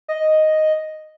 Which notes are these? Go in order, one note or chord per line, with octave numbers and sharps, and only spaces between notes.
D#5